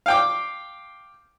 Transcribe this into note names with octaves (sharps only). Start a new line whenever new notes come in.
F5 G5 D6